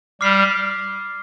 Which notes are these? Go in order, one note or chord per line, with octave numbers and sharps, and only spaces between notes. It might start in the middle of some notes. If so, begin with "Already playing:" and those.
G3 D6 F6 C7